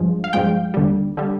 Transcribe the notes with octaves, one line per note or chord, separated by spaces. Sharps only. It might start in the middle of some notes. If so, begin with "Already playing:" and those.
Already playing: G2 F3 G#3
F5
G2 F3 G#3 G5
D#2 D3 G3
D3 G3